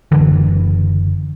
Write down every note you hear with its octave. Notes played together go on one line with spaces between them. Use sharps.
F#1 D3 E3